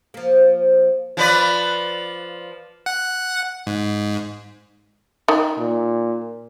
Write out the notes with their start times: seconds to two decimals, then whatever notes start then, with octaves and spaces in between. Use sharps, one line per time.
0.14 F3 A#3
1.17 F3 B4 D5
2.86 F#5
3.67 G#2
5.28 D#3
5.59 A#2